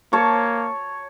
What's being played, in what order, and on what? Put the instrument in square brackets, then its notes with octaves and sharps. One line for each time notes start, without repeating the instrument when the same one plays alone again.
[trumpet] A#3 [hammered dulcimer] C#5 A5 C#6